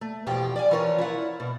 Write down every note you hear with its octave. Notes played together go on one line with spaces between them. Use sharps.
A3
E2 B2 F3 G4 G5
D5 E5 G#5
E3 F3 F4 A#4 C5 C#5
E4 F4 F#5
B2